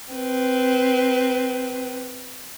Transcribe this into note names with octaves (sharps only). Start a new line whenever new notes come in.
C4 B4